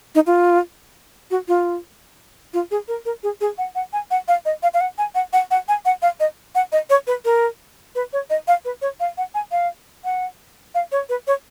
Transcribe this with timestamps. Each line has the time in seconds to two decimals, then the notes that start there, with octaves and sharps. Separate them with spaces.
0.15 D#4
0.27 F4
1.31 F#4
1.48 F4
2.54 F4
2.71 G#4
2.88 A#4
3.05 A#4
3.23 G#4
3.41 G#4
3.58 F#5
3.75 F#5
3.93 G#5
4.11 F#5
4.28 F5
4.45 D#5
4.63 F5
4.74 F5
4.81 F#5
4.98 G#5
5.15 F#5
5.33 F#5
5.51 F#5
5.68 G#5
5.85 F#5
6.02 F5
6.20 D#5
6.55 F#5
6.72 D#5
6.90 C#5
7.07 B4
7.25 A#4
7.95 B4
8.13 C#5
8.30 D#5
8.48 F5
8.65 B4
8.82 C#5
9.00 F5
9.18 F#5
9.34 G#5
9.52 F5
10.04 F#5
10.75 F5
10.92 C#5
11.09 B4
11.27 C#5